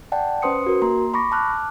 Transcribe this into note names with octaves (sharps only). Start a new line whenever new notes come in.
D5 F#5 G5 A5
C#4 B4 C5 C6 D#6 C#7
F#4 A#4
A#3 A#5 C6
B5 C#6 D6 A#6
A5 D6 F6 F#6